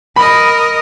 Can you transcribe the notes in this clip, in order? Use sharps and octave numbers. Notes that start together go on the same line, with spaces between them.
A#4 D#5 B5